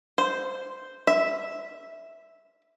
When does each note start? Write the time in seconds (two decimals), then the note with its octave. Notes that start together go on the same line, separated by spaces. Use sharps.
0.18 C5
1.07 E5